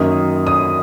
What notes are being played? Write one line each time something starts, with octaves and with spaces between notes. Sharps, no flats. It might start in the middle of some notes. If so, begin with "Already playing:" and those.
Already playing: F#2 D#3 A#3 D#6
D#6